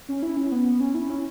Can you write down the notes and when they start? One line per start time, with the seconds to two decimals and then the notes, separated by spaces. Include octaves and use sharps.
0.09 C#4
0.23 E4
0.37 C#4
0.52 B3
0.66 B3
0.80 C#4
0.95 E4
1.10 C#4